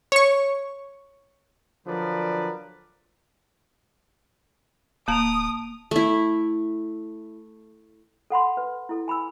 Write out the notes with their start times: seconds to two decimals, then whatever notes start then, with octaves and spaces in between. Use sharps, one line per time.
0.12 C#5 C#6
1.87 D3 F3 F#3 A#4 B4 D5
5.08 D1 A#3 A5 A#5 D#6 D7 F7
5.91 A3 E4
8.30 A4 F#5 B5 C6
8.57 B4
8.89 E4 A4
9.08 G#5 B5 D6 E6